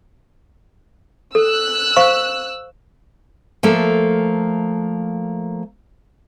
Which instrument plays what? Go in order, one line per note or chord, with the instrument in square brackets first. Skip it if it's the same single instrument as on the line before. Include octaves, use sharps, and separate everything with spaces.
[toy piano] A4 [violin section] E6 F#6
[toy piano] C5 F5 C#6
[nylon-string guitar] F3 A3 A#3 A4